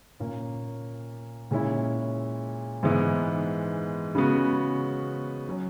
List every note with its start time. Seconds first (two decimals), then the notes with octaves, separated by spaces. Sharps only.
0.20 A#2 A#3 C#4
1.51 A#2 G#3 C#4 E4
2.83 G#2 E3 G#3 B3 E4
4.15 C#3 G#3 B3 F#4
5.49 F#3 C#4